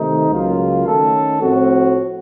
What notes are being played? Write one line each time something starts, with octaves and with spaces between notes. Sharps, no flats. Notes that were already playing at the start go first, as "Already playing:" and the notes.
Already playing: C3 D#3 A3 D#4
C#2 C#3 F#3 A#3 F4
D#3 A3 C#4 A4
A2 F3 C4 F#4